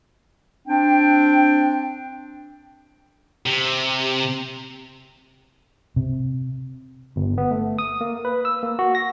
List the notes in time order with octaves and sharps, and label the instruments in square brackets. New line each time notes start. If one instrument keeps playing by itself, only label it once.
[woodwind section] C4 D4 G5
[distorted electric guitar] C3
[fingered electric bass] C3
[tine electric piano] G1
B3
A3
D#6
A#3
B4
E6
A#3
F#4
A#6